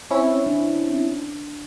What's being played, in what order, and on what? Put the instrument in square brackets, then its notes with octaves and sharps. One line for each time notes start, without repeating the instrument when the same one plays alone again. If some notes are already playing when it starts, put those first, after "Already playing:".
[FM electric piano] C4 C#4 E4
[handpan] D4